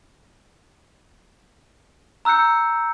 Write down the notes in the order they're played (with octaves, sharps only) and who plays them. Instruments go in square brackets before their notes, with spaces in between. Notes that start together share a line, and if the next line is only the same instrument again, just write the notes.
[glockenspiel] A#5 E6 F#6 G6 C#7